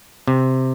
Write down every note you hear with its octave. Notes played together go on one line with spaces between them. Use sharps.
C3